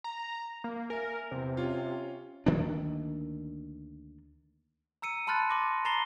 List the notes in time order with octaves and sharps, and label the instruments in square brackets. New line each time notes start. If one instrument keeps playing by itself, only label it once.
[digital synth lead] A#5
A#3
[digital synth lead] A#4 [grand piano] E5 G#5
[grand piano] E2 E3 [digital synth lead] C3
[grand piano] C#4 F4
[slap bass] D2 D#3 A#3 D4
[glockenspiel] A#5 E6 C#7 D#7
A5 B5 C6 F6 F#6 A6
C6 D6 A#6
A#5 B5 A6 A#6 C7 G7